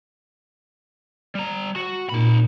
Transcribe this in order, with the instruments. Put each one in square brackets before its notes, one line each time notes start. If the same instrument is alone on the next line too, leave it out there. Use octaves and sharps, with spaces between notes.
[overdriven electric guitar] G3 A#5
F#4
[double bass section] A#2 [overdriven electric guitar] D#4 B5